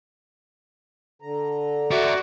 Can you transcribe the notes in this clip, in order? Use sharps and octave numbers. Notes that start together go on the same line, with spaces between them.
D3 A#5
C#4 F#4 D5 E5